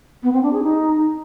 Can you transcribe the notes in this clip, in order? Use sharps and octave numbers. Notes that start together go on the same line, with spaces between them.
B3
C4
D4
G#4
D#4